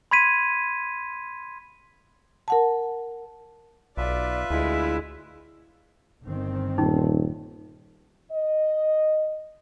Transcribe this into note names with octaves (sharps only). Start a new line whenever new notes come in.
B5 C6 G#6 B6 D#7
A#4 F#5 A5
B1 F4 B4 D5 E5
D2 G#3 E4
G1 D#3 C4
D#1 C#4 D#4
D#5